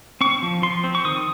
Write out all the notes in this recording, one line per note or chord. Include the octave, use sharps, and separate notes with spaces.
C4 C#6
F3
F3 C6
C4
C#6
D#3 D#6